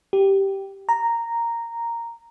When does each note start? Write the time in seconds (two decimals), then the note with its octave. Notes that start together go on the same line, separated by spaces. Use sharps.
0.13 G4
0.89 A#5